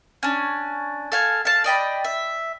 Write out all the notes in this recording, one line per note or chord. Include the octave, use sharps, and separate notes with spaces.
C#4 D4
A4 F5 G#5
F5 A5
D5 D#5 G5 B5
E5